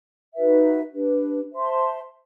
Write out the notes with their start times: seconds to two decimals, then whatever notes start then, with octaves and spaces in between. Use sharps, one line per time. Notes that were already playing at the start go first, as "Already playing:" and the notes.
0.34 D#4 F#4 B4 E5
0.93 D4 G4 B4
1.52 C5 E5 A5 C6